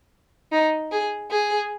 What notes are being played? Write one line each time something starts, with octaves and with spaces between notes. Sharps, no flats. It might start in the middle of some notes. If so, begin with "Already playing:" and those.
D#4
G#4
G#4